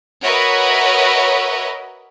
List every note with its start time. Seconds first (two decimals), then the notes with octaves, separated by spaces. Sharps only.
0.22 F#4 A#4 B4 C#5 D#5 E5